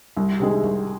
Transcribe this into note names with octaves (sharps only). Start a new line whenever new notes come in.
C2
C3 D#3 G#3
C2